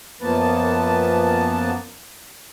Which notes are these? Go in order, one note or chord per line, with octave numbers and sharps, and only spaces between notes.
F#2 F3 A#3 B3 B4 A5